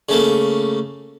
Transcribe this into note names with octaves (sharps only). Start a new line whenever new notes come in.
C#3 A3 A#3